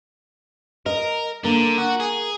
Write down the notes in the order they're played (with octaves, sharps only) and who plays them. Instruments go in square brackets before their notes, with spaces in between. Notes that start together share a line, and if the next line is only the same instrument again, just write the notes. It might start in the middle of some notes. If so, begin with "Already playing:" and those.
[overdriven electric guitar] A#4 [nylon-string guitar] D#5
[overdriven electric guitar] D3 [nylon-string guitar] A#3
[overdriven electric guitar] F#4
G#4